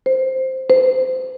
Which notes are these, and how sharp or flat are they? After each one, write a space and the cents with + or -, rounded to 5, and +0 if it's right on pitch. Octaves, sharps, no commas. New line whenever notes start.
C5 +0
C5 -25